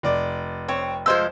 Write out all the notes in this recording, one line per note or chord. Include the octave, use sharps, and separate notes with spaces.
F1 D5
C4 C#5
F3 G#3 A4 C5 E6